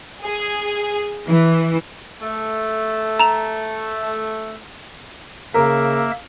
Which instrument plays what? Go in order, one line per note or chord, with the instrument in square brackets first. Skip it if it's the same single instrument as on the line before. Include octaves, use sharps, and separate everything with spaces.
[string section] G#4
E3
[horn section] A3
[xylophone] A#5 F7
[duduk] C#3 [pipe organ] A#3 E5 [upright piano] A#4